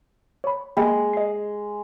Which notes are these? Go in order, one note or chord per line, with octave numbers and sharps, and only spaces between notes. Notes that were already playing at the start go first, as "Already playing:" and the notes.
C#5 B5
G#3 A#3 G5 B5
D#5 C7